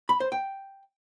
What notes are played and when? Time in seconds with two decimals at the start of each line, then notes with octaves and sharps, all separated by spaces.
0.09 B5
0.20 C5
0.32 G5